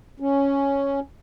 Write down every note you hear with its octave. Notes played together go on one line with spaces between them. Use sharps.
C#4